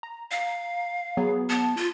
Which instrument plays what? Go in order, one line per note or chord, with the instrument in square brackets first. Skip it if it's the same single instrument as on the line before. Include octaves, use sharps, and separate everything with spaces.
[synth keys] A#5
[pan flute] F5
[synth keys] F#3 B3 G#4
[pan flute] B3 [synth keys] A5
[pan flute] F4